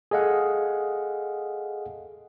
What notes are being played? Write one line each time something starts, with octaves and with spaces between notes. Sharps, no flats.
G#4 A4 D#5 F5 F#5